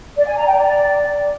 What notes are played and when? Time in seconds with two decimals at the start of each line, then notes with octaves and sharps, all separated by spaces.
0.17 D5
0.27 G#5
0.37 A#5
0.47 G5
0.57 D5